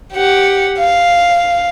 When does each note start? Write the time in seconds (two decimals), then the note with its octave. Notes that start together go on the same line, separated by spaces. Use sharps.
0.13 G4 F#5
0.78 F5